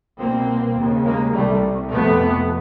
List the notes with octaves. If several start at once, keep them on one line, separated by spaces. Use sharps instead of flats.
C2 B2 A#3 C4
D#2 C#3
G#3 A#3
C2 C3 G3 A3
F2 C3 A3 B3